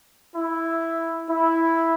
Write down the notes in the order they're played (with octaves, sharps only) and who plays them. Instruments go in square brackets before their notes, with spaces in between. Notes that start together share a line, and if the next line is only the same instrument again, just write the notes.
[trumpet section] E4
E4